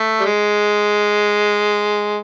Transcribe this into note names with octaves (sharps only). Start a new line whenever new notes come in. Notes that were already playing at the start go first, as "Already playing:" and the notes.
Already playing: A3
G3
G#3